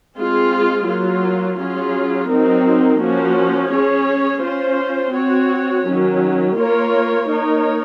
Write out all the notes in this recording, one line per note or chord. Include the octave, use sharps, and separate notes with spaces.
G#3 C4 F4 G#4
F#3 A#3 F4
F#3 C#4 F4 G#4
F#3 C4 D#4 A#4
F3 A#3 C#4 F#4
C#4 G#4 C#5
C#4 F4 C5
C4 F#4 C#5
D#3 F#3 C#4
A#3 F4 A#4 C#5
A#3 D#4 A#4 C#5